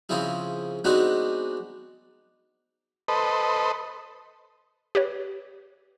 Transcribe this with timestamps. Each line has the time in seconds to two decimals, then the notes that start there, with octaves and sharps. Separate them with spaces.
0.09 C#3 F3 C4 E4 G#4
0.85 G#3 B3 C4 D4 D#4 F#4
3.08 A4 B4 C5 D#5
4.95 G4 B4 C#5